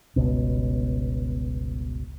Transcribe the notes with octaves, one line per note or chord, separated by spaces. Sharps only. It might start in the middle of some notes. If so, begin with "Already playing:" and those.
G1 C#2 B2